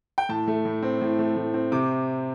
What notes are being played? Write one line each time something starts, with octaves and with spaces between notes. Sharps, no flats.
G5
A2 A5
A3
A2
C4
A2
A3
A2
C4
C3 D6